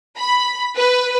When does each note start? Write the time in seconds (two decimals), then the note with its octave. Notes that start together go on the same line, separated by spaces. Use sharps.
0.19 B5
0.76 B4